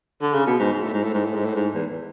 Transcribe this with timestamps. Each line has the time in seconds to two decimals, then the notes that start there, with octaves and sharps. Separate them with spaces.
0.22 D3
0.34 C#3
0.47 B2
0.59 G#2
0.72 G#2
0.83 A2
0.93 G#2
1.03 A2
1.14 G#2
1.24 A2
1.35 G#2
1.45 A2
1.55 G#2
1.74 E2